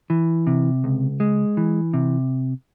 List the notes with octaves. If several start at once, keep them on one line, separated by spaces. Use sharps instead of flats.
E3
C3
C#2
G#3
E3
C3